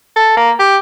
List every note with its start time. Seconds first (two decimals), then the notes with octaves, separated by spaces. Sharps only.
0.16 A4
0.37 A#3
0.59 G4